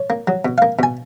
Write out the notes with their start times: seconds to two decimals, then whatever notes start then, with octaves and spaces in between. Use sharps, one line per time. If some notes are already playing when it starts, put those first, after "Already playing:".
Already playing: C#5
0.10 A#3
0.27 F#3
0.45 B2
0.58 A#3 F5
0.79 B2 G#5